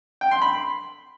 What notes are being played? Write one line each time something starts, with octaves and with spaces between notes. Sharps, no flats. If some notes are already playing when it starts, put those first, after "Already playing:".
G5
C6
B5